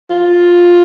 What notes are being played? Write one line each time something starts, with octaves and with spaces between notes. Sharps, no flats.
F4